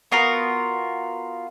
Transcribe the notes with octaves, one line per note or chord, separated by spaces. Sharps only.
B3 F4 F#4 A#4